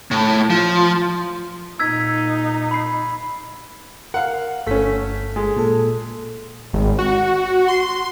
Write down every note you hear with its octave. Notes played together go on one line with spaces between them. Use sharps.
A2
F3
A#2 D#4 E6 G#6 B6
B5 C7
A#4 F5 F#5
G1 A3 C#4 A4 B6
G#3
A#2 A4
G#1
F#4
C6